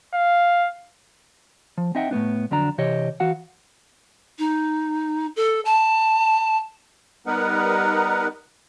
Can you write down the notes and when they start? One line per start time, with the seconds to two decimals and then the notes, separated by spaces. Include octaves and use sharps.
0.14 F5
1.78 F3
1.95 C4 D#4 D#5 E5 F#5 G5
2.11 A2 A3 B3 D4
2.51 F2 D3 F#3 D4 A#5
2.78 C3 E3 G4 C#5 D#5
3.20 E3 F#4 F5 F#5
4.39 D#4
5.36 A4
5.65 A5
7.27 G3 B3 D#4 A#4 B4 F#5